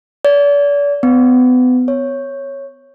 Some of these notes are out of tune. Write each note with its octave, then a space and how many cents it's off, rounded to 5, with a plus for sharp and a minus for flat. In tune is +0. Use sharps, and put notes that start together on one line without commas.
D5 -40
B3 +35
C#5 -5